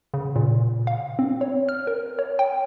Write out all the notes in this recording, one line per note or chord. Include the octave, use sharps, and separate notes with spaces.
C#3
A#2
F5
C4
C#5
F6
A#4
C#5
G5